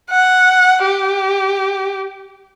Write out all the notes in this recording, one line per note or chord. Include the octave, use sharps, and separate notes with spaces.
F#5
G4